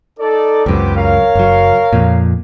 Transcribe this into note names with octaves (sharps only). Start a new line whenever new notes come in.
D#4 A4 D5
C#2 F#2 B3 C4 G4
A#4 C#5 F5
F#1 F#3
F2 A#2